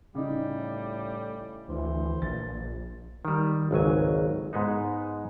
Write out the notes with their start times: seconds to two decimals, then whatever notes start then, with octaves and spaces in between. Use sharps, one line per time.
0.15 A2 C#3 G3 D#4
1.69 D2 E3 C5
2.22 A#1 A#2 A6
3.25 D#3 G3
3.71 G#1 C#2 F#3 G#5
4.53 G#2 G#3 B3 D#4